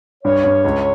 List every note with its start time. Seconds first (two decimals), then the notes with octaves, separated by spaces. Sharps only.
0.24 G2 C#5
0.44 G2
0.64 C#2